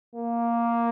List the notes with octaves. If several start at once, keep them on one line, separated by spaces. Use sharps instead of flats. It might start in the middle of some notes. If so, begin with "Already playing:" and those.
A#3